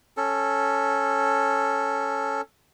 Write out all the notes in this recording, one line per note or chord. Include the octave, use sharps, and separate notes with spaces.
C#4 A4